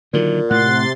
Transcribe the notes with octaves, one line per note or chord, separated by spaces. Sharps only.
A#2 D3 D#3 F#3
A2 C3 F#5 C6 A6